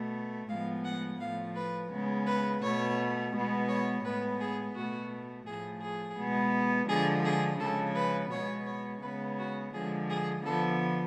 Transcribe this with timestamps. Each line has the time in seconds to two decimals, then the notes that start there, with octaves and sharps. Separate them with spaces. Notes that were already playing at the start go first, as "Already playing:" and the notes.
Already playing: B2 A3
0.49 A2 F3 G#3 B3 F5
0.85 F#5
1.20 A2 F3 A3 F5
1.56 B4
1.91 C#3 G#3 B3
2.27 B4
2.62 B2 A3 C#5
3.34 B2 G#3 B3
3.69 C#5
4.05 A2 G#3 B3 B4
4.40 G#4
4.76 B2 A3 F#4
5.47 A2 F3 A3 G#4
5.82 G#4
6.19 B2 G#3 B3
6.89 D3 F3 G#3 G#4
7.25 G#4
7.60 C#3 F3 G#3 A4
7.95 B4
8.31 B2 G#3 B3 C#5
8.67 C#5
9.02 C#3 G#3 B3 B4
9.39 F#4
9.74 D3 F3 G#3 G#4
10.10 G#4
10.44 D3 F3 B3 A4